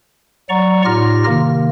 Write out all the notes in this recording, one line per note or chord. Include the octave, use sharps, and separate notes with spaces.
F#3 D5 F#5 A#5 C#6
A2 D#4 F4 G4 F6 A#6
C3 D#3 A#3